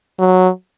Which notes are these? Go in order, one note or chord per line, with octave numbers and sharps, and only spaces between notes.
F#3